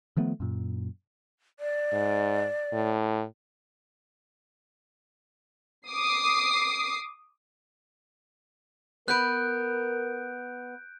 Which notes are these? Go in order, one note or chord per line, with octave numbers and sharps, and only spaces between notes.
D#3 F3 A3 B3
F#2 A#2
D5
G#2
A2
D6 D#6 C7
B3 A#4 B4 F#6 G6 D7